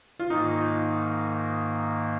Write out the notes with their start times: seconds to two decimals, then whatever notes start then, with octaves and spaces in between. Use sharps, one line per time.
0.19 F4
0.30 G#2 D#3 A#3 D#4